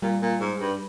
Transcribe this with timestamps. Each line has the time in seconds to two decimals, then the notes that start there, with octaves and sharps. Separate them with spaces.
0.02 A#2 G3
0.22 A#2
0.40 G#2
0.60 G2